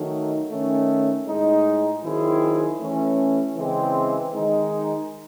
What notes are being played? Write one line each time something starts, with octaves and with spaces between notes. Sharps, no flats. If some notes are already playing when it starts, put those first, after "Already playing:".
Already playing: D#3 F#3 A3 D#4
D#3 A3 C#4
A2 G#3 D#4
D#3 F#3 C4 E4 G#4
E3 A3 C#4
C#3 E3 G#3 C4
D#3 G#3 D#4